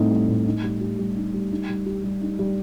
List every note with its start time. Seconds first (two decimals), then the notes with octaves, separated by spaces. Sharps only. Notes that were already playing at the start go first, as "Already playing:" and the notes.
Already playing: A2 G3 C4 D#4
0.10 G3
0.28 A2
0.46 D#4
0.63 G3
0.81 G4
0.98 G3
1.16 D#4
1.34 G3
1.51 D#4
1.69 G3
1.86 G4
2.04 G3
2.21 D#4
2.39 G3